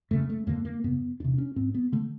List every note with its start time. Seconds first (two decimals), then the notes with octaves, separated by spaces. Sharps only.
0.11 F#2 C#3 A3
0.30 A3
0.47 F2 D3 A#3
0.65 A#3
0.84 F#2 C#3 B3
1.20 E2 C3 D4
1.38 C#4
1.56 G#2 C4
1.75 B3
1.92 D3 A3